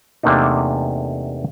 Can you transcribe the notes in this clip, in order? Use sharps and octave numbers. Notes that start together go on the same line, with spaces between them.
E2 C3 A3 A#3 D4 D#4